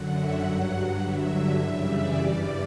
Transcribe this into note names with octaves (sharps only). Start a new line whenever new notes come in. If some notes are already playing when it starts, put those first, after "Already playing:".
Already playing: F#2 D3 F#3 F#5
E5
G2 F#3 F#5
F#5
G2 D3 F#3 E5
F#2 C#3 E3 G3
D5
G2 E3 G3